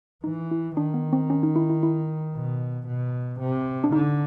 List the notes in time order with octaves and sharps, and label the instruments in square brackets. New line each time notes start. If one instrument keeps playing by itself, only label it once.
[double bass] E3 [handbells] D#4
[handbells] E4
[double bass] D#3 [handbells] D4
[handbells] B3
C4
C#4
D#4
E4
E4
E4
[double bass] B2
B2
C3
[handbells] D4
[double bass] D3 [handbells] D#4